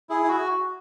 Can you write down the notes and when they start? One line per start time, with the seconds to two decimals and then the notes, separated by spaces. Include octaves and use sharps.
0.09 E4 G#4
0.23 E4
0.28 F#4